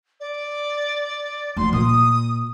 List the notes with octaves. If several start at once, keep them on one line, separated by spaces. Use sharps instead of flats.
D5
D2 F3 C6
A#2 D#6